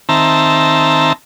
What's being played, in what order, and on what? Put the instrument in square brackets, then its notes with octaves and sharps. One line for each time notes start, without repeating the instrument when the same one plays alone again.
[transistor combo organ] D#3 C4 E5 A5 A#5